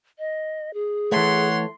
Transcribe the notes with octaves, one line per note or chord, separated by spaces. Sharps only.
D#5
G#4
E3 A3 C#5 F#5 C6